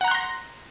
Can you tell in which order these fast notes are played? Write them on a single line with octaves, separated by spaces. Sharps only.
F#5 A#5 F#6 C6 A#6